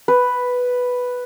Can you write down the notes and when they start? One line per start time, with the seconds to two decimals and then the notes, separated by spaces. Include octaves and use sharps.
0.08 B4